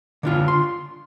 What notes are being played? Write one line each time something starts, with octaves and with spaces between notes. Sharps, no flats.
D3 D4 F4
C6